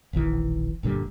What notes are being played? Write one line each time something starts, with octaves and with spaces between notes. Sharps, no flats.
E1 A#1 D#3 E3
F#1 A#2 D3 G3